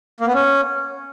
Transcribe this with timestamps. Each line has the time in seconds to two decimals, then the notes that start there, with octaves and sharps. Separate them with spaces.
0.20 A#3
0.27 B3
0.34 C#4